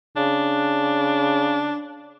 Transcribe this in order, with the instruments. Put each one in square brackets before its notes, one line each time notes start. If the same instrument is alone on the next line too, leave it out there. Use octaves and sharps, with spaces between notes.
[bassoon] C#3 [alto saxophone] D4